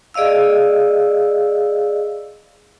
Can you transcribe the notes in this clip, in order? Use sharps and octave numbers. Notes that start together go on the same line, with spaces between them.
G#4 D5 D#5 F5 E6